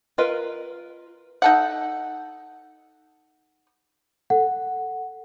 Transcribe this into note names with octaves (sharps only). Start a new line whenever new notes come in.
F4 A#4 B4 D#5
D#4 A4 F#5
A4 F#5